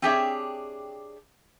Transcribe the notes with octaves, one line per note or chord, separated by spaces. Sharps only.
C4 D4 G4 G#4 C#5 E5